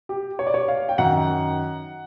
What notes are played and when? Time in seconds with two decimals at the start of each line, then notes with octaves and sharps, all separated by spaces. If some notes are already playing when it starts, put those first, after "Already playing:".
0.09 G4
0.39 C#5
0.47 D5
0.54 C#5
0.68 F5
0.89 G5
0.98 F#2 D#3 F#5